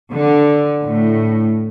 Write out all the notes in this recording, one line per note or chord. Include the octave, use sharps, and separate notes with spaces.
D3
A2